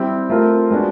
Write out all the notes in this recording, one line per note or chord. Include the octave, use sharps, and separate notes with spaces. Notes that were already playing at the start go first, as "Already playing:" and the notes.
Already playing: G3 C4 E4 G4
A3 C4 F4 A#4
G#3 B3 D4 F#4